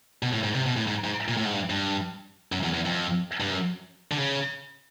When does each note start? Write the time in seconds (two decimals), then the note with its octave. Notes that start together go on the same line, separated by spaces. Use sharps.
0.23 B2
0.33 A2
0.43 G#2
0.55 C3
0.66 B2
0.77 A2
0.88 G#2
1.04 G#2
1.28 A#2
1.37 A2
1.45 G#2
1.54 G2
1.70 G2
2.52 F#2
2.63 E2
2.74 E2
2.86 F2
3.40 G2
3.51 F#2
4.12 D3
4.18 C#3